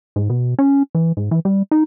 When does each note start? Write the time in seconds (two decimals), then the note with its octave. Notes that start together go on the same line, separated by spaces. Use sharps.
0.16 G#2
0.30 B2
0.59 C#4
0.95 E3
1.17 G#2
1.31 E3
1.45 G3
1.71 D#4